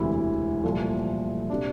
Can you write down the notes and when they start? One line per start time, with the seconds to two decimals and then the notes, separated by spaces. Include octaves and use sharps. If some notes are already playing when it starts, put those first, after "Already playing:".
Already playing: E1 D2 C3 E3 E4
0.63 C2 A#2 F3 A3
1.50 C3 D4